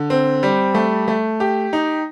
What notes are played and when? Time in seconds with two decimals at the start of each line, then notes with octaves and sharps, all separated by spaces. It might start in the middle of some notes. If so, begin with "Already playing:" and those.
Already playing: D3
0.10 C4
0.43 G3
0.74 A3
1.08 A3
1.40 G4
1.73 D#4